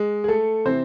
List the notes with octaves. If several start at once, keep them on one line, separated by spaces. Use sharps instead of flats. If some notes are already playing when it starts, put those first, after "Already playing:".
Already playing: G#3
G#4
A3 A4
C3 E3 C4 C5